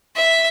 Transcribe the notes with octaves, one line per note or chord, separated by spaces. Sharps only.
E5